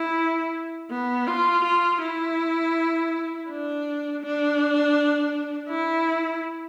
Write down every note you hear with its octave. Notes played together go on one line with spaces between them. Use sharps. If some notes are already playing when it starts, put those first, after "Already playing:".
Already playing: E4
B3
F4
F4
E4
D4
D4
E4